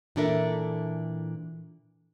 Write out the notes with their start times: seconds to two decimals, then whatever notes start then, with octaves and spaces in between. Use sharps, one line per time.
0.16 A#2 E3 D4 A4 A#4 E5